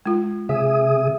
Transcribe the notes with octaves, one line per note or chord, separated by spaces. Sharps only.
G#3 F4
C3 G#4 E5 D#6